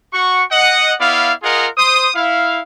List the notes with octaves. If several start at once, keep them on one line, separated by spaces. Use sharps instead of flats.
F#4 F#5 C#6
D#5 F#5
B3 E4 D5 F5
F4 G#4 A#4 D#5 F#5
C5 D#6
E4 F5